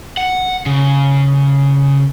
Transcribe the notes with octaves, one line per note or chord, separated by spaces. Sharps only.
F#5
C#3